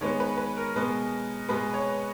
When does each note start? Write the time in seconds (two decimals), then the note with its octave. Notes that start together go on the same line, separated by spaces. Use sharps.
0.01 D#3 G#3 B3 C#5
0.20 B4
0.37 B4
0.57 A#4
0.76 B2 G#3 B3
1.49 B2 G#3 B3 B4
1.74 C#5